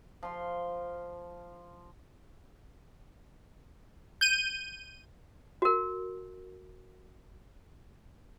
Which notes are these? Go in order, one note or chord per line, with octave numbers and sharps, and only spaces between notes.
F3 C6
G6 D#7
F#4 A#4